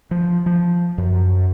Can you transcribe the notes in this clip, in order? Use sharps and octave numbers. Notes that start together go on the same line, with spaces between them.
F3
F3
F#2